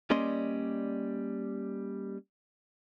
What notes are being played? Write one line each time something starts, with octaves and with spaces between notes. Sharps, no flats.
G3 A#3 C#4 D5 D#5 C6